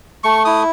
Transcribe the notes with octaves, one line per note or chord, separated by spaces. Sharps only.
A3 C#6
E4 D#6